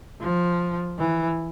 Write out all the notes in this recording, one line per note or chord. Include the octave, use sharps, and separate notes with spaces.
F3
E3